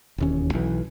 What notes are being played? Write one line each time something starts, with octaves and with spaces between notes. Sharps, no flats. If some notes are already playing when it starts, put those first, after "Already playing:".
E1 D#2 C#4
B1 E3